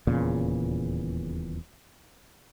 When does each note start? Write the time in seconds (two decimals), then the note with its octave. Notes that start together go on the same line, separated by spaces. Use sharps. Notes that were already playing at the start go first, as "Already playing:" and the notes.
0.07 D#1 E2 A#2 C#3